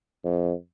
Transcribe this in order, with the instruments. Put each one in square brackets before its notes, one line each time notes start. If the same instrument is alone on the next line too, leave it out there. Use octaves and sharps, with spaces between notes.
[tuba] F2